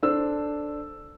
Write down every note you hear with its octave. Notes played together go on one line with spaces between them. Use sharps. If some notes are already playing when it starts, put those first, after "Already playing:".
D4 A4 C5 E6